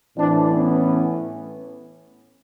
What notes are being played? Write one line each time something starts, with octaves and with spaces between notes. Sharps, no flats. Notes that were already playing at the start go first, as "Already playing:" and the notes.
A2 E3 C4 D4
B3 C#4